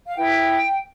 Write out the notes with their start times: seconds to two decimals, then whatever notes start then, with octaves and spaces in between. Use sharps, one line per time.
0.06 F5
0.16 E4 B4 G5